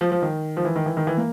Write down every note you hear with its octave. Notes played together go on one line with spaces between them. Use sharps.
F3
F3
D#3
F3
E3
D#3
E3
D#3
E3
A#3